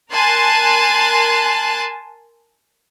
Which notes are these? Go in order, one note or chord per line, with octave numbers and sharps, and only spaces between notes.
A#4 G#5 A5 C6 F#6